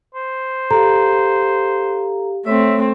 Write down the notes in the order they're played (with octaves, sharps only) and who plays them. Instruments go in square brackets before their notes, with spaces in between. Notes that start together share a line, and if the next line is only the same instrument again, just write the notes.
[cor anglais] C5
[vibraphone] G4 F5 [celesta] A4 A#5
[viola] A3 C4 [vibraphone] C#5 [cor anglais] E5